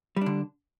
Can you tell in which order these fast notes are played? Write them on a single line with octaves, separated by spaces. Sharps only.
G3 D4 D3